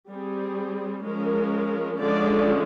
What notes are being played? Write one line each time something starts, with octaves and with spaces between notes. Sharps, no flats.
G3 C4 G#4
F3 G#3 C#4 A#4
D3 F3 G#3 C#4 D5